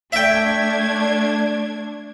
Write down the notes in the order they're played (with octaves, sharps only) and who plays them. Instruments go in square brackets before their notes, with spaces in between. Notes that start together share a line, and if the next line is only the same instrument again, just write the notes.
[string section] A3 D4 G#6 [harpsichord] E5 G5